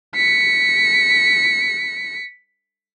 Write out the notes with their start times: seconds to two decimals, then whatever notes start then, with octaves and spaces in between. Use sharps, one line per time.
0.16 B6 C#7